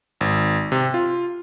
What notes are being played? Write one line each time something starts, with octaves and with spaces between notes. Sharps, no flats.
G#1
C3
F4